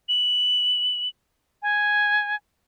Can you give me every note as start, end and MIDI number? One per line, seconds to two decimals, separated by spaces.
0.09 1.09 102
1.62 2.36 80